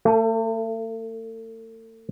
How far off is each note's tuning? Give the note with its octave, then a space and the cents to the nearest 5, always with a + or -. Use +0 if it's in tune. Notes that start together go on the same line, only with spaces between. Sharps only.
A3 +40 A4 +5